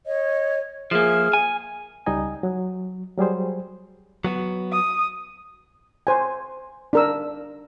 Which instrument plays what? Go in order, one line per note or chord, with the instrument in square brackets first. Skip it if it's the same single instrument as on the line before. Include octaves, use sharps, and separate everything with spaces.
[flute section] C#5 D#5
[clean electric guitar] F3 A#3 [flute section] G#4 E5 F6
[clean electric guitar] G#5
[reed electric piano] C#2 G3 D#4 D#5 G#5
F#3
F#3 G3 G#4 C5
[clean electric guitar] F#3 B3 F#4
[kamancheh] D#6
[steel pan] C5 G#5
D4 A#4 E6